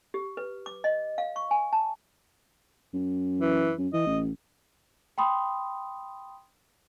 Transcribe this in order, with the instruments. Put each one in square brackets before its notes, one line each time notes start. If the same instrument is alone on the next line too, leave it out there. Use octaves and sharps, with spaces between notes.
[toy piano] G4
B4
D6
D#5
F5
C#6
G#5
A5
[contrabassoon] F#2
[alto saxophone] E3
[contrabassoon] F#2
[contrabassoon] E3 [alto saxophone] D#5
[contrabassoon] A1
[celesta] G5 B5 C6 D#6